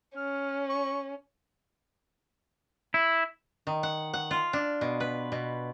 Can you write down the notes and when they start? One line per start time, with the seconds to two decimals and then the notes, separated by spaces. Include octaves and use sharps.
0.17 C#4 F6
0.69 C#6
2.94 E4
3.67 D#3
3.83 F#5
4.14 F#5
4.31 F4
4.53 D4
4.81 B2
5.00 B4
5.32 B2